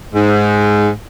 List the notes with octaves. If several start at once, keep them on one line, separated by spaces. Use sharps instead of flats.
G#2